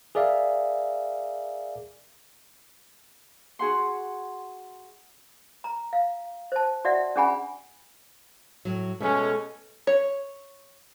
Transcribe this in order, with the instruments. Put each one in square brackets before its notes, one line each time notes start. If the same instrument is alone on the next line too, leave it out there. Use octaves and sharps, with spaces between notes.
[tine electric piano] G#4 A#4 D5 E5 F5
[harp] F#4 G#4 F#5 C6
[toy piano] A#5
F5
C5 A5
F#4 D5 E5 F#5
C#4 D4 G#4 F#5 G#5 B5
[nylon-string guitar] A2 F#3
[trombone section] B2 G#3 C#4 [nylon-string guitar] A3 A4
[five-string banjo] C#5